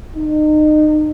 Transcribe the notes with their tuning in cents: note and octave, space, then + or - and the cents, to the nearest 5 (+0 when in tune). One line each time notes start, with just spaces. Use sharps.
D#4 -30